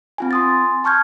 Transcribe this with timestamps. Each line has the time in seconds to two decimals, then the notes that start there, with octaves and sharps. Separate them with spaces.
0.18 C4 F4 G#5
0.31 C6 D#6 A6
0.84 A5 C#6 F6 G6 G#6